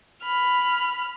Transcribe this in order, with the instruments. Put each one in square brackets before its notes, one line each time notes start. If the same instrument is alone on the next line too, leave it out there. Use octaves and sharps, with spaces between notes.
[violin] B5 F6